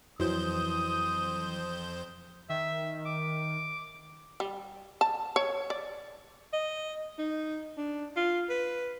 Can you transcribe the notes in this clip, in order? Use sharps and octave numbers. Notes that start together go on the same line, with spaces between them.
F2 E3 F#3 C5 D#6 G6
D#3 E5
D6
G3
A5
C#5
D5
D#5
D#4
D4
F4
B4